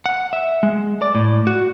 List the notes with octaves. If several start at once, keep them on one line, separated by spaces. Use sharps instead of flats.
F#5
E5
G#3
D5
A2
F#4